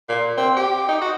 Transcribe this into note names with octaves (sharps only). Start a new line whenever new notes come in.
A#2
C4
G4
D#4
F#4